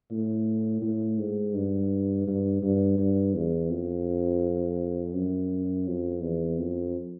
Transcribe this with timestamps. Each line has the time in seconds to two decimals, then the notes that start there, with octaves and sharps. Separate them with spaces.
0.11 A2
0.82 A2
1.19 G#2
1.55 G2
2.27 G2
2.63 G2
2.98 G2
3.35 E2
3.70 F2
5.15 F#2
5.87 F2
6.22 E2
6.59 F2